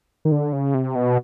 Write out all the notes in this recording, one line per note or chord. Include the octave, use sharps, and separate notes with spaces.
D#3
D3
C#3
C3
B2